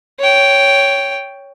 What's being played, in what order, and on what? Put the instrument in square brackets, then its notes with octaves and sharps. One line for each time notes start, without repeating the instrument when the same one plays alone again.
[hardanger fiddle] C#5 G5